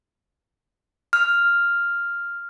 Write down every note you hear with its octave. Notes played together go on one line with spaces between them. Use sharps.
F6